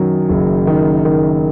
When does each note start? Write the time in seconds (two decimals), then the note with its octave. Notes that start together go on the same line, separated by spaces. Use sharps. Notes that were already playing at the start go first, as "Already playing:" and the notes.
Already playing: F#2 D#3 F#3
0.29 F#1
0.67 D#3
1.05 D#3